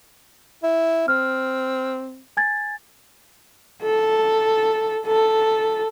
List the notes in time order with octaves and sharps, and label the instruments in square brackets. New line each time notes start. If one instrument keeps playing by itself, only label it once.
[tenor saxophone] E4
[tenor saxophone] C4 [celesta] F6
[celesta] G#5 G#6 A6
[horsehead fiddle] A4
A4